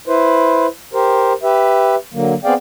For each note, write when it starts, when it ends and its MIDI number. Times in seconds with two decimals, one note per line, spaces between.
0.08 0.67 64
0.08 0.67 71
0.08 0.67 72
0.94 1.33 67
0.94 1.33 70
0.94 1.33 72
1.43 1.95 67
1.43 1.95 71
1.43 1.95 76
2.13 2.34 50
2.13 2.34 54
2.13 2.34 58
2.45 2.54 59
2.45 2.54 60
2.45 2.54 68
2.45 2.54 74
2.45 2.54 77
2.45 2.54 79